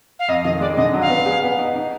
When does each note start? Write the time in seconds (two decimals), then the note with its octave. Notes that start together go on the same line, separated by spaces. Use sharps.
0.19 F5
0.28 F2 D#5
0.44 D#3 D#5
0.60 G#3 D5
0.77 D3 D#5
0.93 F#3
1.01 F5
1.10 B3
1.26 G#4
1.43 B3
1.59 D#4
1.76 D#4